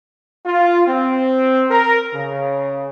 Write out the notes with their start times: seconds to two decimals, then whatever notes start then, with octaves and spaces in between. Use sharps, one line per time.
0.46 F4
0.87 C4
1.70 A#4
2.14 C#3